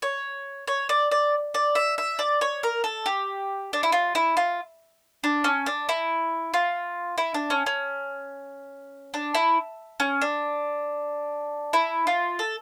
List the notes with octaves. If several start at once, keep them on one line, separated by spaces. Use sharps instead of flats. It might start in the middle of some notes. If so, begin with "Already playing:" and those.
C#5
C#5
D5
D5
D5
E5
E5
D5
C#5
A#4
A4
G4
D4
E4
F4
E4
F4
D4
C#4
D4
E4
F4
E4
D4
C#4
C#4
D4
E4
C#4
D4
E4
F4
A4